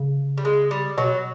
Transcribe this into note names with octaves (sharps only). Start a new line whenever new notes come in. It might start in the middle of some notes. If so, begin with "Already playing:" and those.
Already playing: C#3
G3
G#3
G3
B2 F#3